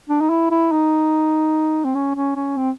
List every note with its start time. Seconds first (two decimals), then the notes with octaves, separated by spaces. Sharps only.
0.09 D4
0.20 D#4
0.30 E4
0.50 E4
0.72 D#4
1.85 C4
1.95 C#4
2.15 C#4
2.36 C#4
2.57 C4